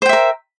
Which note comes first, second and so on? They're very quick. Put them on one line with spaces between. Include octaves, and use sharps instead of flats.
C5 G5 E5 A#4